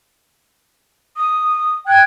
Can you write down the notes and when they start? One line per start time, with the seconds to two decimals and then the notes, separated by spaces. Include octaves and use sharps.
1.16 D#6
1.87 G5 F#6 G#6